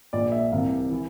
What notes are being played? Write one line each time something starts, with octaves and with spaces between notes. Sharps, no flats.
A#1 A#2 D5
E5
C2 C3 E3 F5
E3